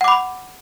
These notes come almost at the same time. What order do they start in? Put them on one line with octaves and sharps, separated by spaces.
F#5 D6 B5